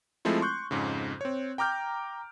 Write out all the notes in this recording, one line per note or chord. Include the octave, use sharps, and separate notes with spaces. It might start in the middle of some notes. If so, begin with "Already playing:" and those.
F3 G#3 A3 C4 E4
C6 C#6 F#6 G6
F2 G#2 C#3
C4 C#5
G5 A#5 D6 F6 G6